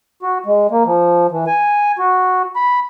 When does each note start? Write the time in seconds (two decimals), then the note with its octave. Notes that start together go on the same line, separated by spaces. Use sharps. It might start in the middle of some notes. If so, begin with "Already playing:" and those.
0.23 F#4
0.46 G#3
0.71 A#3
0.86 F3
1.32 E3
1.47 G#5
1.99 F#4
2.56 B5